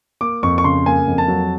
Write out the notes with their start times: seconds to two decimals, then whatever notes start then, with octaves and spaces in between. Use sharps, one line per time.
0.21 A#3 D6
0.43 F2 C#6
0.58 C#6
0.64 C#3 C6
0.86 A#3 G#5
1.08 F2
1.18 A5
1.28 F#3